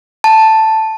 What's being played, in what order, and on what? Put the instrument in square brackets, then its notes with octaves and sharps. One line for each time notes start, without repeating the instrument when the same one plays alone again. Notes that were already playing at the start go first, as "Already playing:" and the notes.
[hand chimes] A5